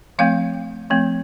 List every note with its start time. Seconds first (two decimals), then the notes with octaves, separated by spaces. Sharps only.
0.19 F3 A3 C4 F5
0.90 F3 A3 C4